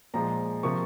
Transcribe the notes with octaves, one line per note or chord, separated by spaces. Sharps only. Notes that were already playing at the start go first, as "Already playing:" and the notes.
A#2 F3 G#3 A#5
C3 F3 A#3 C#6